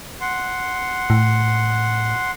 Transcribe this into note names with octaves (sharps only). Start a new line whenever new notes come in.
F#5 C6
A2